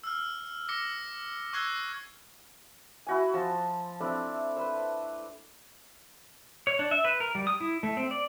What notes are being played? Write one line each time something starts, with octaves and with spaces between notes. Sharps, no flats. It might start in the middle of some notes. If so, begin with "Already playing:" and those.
E6 F6
D6 E6 A#6 C#7 G7
C#6 E6 F#6 G#6 C7 G7
E4 F#4 G#5
F3 A5 C6
A3 C4 D4 E4
B4 C5
C#5
D4
E5
B4
A#4
G3
D#6
E4
A3
C4
D5